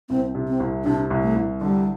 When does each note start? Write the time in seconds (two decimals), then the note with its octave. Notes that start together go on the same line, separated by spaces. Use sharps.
0.09 C2 C4
0.35 C3
0.48 C4
0.60 C2
0.85 C3 D4
1.10 C2
1.23 A3
1.36 C2
1.61 D3 G3